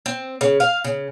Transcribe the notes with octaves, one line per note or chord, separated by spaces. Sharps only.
C4
C#3
F5
C#3